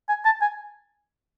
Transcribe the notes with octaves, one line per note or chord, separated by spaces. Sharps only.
G#5
A5
G#5